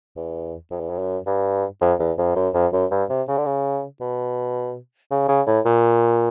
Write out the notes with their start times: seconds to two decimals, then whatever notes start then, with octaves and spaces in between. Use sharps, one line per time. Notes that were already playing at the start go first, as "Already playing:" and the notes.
0.16 E2
0.71 F2
0.80 E2
0.89 F2
0.99 F#2
1.26 G2
1.81 F2
1.99 E2
2.18 F2
2.36 F#2
2.54 F2
2.73 F#2
2.91 G2
3.09 C3
3.28 C#3
3.38 D3
3.46 C#3
4.01 B2
5.11 C#3
5.29 C#3
5.47 A2
5.65 A#2